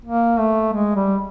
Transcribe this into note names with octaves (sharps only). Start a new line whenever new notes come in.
A#3
A3
G#3
G3